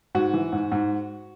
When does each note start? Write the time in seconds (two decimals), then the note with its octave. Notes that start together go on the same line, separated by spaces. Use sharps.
0.15 G#2 F#4
0.34 E3
0.53 G#2
0.72 G#2